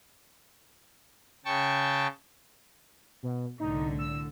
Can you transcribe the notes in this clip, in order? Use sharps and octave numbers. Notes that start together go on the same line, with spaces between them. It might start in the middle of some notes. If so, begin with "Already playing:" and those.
C#3 G5 A5 C#6
B2
C2 A2 D3 D#4
E6